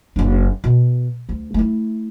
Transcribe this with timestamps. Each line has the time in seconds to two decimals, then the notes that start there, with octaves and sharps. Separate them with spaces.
0.16 F#1 D4
0.64 B2
1.29 D2
1.54 A3 E4